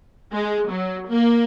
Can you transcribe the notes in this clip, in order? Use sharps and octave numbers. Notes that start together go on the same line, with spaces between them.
G#3
F#3
A#3